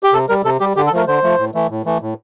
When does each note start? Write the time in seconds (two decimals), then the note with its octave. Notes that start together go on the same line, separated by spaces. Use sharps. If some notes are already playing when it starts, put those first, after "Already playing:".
0.03 G4
0.13 C3 A4
0.29 G3 A#4
0.45 C3 A4
0.60 G3 G4
0.76 D3 G4
0.87 A4
0.92 F3 A3 A#4
1.07 D3 C5
1.23 F3 A3
1.38 A2
1.54 E3 A3
1.70 A2
1.85 E3 A3
2.01 A2